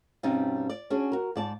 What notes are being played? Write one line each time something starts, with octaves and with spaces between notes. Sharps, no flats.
G2 B2 G3 C4 C#4 D#4
D5
C#4 D4 F#4 G#4
F#4 A#4
G#2 D5 A5